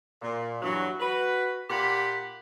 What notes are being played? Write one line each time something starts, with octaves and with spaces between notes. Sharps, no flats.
A#2
G2 E3 F#3
F#4 B4
A#2 A#3 G4 F#5 B5